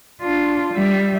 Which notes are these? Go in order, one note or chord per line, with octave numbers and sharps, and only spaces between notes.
D4 F4
G3 E5